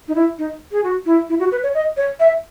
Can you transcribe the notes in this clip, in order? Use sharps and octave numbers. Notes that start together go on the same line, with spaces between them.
D#4
E4
D#4
G#4
F#4
E4
E4
F#4
B4
C#5
D#5
C#5
E5